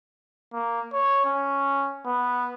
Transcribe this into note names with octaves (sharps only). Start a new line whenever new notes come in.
A#3
C#5
C#4
B3